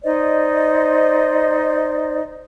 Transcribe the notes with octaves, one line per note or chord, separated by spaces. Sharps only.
D#4 C5 D5 D#5